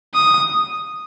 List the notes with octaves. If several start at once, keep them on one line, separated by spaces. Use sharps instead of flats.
D#6